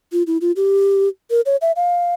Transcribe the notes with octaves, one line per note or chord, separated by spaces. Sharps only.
F4
E4
F4
G4
A#4
C#5
E5
F5